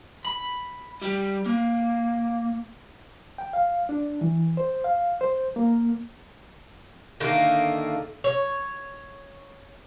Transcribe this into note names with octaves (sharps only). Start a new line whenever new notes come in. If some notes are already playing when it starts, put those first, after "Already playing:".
B5
G3
A#3
G5
F5
D4
E3
C5
F5
C5
A#3
D3 D#3 A3 A#3
C#5